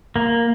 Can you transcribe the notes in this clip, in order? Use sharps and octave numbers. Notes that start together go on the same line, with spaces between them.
A#3